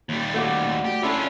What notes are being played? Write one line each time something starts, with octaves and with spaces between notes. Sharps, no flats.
D#2 G3
A3 F#4 D5
G4
D3 C#4 D4 E4 F4